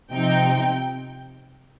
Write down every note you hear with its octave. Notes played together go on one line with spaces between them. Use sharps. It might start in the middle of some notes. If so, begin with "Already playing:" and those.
C3 F3 C4 D#4 G5